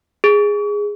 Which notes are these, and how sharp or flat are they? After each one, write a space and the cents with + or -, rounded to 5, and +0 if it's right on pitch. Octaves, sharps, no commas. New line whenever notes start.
G#4 -10